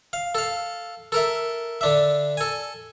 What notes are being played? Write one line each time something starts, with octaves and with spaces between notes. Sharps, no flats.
F5
A4 F5
A4 A#4 E5
D3 D4 E5
A4 G#5